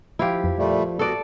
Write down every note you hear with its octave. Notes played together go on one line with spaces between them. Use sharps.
F3 E4 F4 G4
F2
A#2 G3 A3
B3 F#4 A4 D5